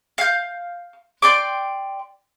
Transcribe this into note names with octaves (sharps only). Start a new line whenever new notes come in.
F5 G6
D5 G5 C6 D6